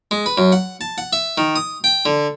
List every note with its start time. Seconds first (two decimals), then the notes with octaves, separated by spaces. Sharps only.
0.11 G#3
0.26 B4
0.38 F#2
0.52 F#5
0.81 A5
0.98 F#5
1.13 E5
1.38 D#3
1.56 D#6
1.84 G5
2.05 D3